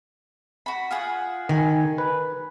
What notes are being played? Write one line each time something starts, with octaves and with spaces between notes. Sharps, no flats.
F#4 B5
F4 G#4 F#5
D#3 G#5
B4